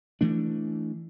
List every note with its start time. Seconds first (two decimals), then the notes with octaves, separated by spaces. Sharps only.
0.21 E3 A3 D4